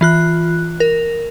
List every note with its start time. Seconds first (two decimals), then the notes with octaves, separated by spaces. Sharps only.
0.01 E3 F4 F#6
0.80 A#4